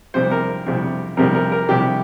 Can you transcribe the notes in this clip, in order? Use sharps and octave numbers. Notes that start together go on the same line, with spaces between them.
F2 C3 G3 C5
A#4
F2 C3 G3
F2 C3 G3 A#4
A#4
A#4
F2 C3 G3 G4